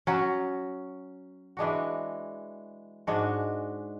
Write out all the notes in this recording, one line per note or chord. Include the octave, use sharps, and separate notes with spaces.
F#3 C#4 F#4
E3 G#3 D4 F#4
G#2 G#3 D4 F#4